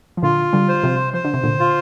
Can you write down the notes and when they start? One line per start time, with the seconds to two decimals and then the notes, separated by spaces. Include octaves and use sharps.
0.17 F3
0.23 A#2 D3 F4
0.53 D3 G3
0.69 C5
0.83 C3 F3
1.13 F3 C5
1.25 D3
1.34 C3
1.44 A#2 D3
1.60 F4